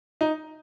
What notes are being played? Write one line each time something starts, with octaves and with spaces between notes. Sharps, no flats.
D#4